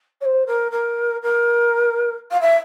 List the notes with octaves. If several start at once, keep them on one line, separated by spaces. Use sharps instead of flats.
C#5
C5
A#4
A#4
A#4
F5
E5